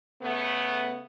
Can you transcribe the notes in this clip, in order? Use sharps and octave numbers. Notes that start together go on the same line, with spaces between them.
C#3 A3 B3